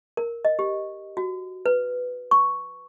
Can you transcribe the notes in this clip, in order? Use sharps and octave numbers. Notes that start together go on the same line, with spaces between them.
A#4
D#5
G4
F#4
B4
C#6